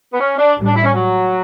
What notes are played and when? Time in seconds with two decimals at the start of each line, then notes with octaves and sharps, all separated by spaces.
0.12 B3
0.20 C#4
0.38 D4
0.57 A1 A2 G3
0.66 D4
0.75 E4
0.84 C#4
0.94 F#3